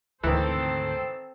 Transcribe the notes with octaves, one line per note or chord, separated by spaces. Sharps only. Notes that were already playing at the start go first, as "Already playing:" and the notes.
D2 G#2 D#3 E3 C4 A4 C5